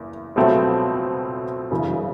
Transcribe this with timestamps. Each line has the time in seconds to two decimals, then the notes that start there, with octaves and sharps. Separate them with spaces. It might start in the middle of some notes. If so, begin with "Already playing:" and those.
Already playing: F#1 E2 A#3
0.36 C#2 B2 F#3 A3 C4
1.71 G1 F#2 C#3 E3